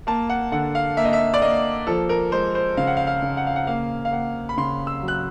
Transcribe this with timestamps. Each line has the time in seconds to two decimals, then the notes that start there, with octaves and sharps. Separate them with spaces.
0.07 A#3 A5
0.30 F#5
0.52 D3 F#5
0.75 F5
0.97 A#3 E5
1.05 D#5
1.13 E5
1.34 D5
1.42 A#3 D#5
1.87 F3 A4
2.09 A#4
2.32 G#3 C5
2.55 C5
2.77 C#3 F5
2.87 F#5
2.97 F5
3.07 F5
3.22 C#3
3.37 F#5
3.47 F5
3.56 F#5
3.67 A#3 F5
4.05 F5
4.12 A#3 F#5
4.49 B5
4.57 C#3 C6
4.87 E6
5.03 F#3
5.08 F#6